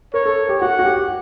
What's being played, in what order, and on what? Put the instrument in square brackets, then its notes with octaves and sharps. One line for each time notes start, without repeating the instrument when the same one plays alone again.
[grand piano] A#4 [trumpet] C#5
[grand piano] A4
G4
[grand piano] F#4 [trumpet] F#5
[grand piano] F#4
G4